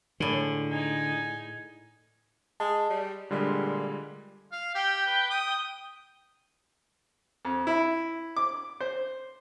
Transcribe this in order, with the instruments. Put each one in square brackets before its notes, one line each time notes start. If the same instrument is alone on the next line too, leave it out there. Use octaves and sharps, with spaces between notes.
[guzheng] A2 G#3 [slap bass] D3
[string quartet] D#4 [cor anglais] G#5
[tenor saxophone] G#3 [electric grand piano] A5
[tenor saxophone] G3
[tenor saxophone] A#2 [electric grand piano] D3 G3 G#3
[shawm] F5
[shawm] G4 [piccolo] G5
[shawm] B4
D#6
[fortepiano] F2
E4
D6
C5